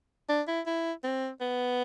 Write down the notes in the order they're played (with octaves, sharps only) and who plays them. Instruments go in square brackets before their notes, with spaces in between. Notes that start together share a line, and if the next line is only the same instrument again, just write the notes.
[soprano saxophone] D4
E4
E4
C4
B3